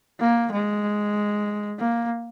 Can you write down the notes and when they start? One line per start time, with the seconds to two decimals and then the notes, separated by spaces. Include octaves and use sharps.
0.20 A#3
0.52 G#3
1.79 A#3